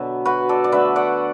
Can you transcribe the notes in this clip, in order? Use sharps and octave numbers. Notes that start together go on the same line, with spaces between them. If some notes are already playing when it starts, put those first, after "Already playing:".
Already playing: B2 D3 F#3 B3 B4 E5
F#4 B4
A4 D5
D5
D3 A3 B4 E5
D5 F#5